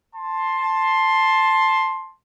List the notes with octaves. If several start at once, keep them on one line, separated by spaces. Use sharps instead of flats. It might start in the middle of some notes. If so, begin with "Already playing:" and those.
A5 C6